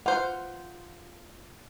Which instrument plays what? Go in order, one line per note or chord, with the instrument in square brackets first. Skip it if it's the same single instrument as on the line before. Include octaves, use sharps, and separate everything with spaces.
[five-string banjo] F4 C5 [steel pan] F#5